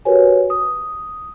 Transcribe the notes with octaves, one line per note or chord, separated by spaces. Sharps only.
F#4 G4 A#4 B4 C#5 G#5
D#6